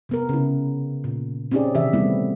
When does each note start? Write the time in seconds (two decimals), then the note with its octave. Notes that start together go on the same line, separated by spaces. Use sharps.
0.09 C3 B3 A#4
0.29 C#3 E4
1.04 A#2
1.51 C4 C#4 D#4 G4 G#4 D5
1.75 C3 D#3 E3 G4 E5
1.93 G3 A3 B3 C4 E4